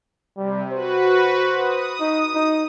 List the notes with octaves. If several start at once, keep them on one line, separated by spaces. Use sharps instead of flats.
C3 G3
F#4 B4 C5
D#6
D#4
D#4